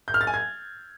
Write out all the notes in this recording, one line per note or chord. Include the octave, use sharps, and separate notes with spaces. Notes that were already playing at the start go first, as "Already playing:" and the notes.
G6
F6
A6
G#5
G#6